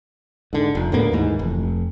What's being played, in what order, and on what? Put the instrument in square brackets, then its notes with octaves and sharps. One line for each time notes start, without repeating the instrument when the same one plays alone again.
[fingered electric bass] G#2 D3
F1
D2 A2 A#3 B3
D#2 G#2 E3
F1